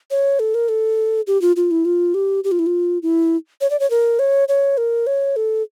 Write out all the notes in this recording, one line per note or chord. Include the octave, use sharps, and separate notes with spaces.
C#5
A4
A#4
A4
G4
F4
F4
E4
F4
G4
G4
F4
E4
F4
E4
C#5
D5
C#5
A#4
C#5
C#5
A#4
C#5
A4